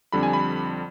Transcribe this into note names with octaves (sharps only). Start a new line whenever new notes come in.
F2 D3 G3 B5
G#5
B5